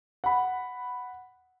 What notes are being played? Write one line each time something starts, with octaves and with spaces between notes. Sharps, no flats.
F#5 B5